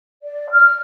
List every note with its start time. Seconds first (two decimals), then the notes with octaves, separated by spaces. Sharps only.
0.23 D5
0.51 F6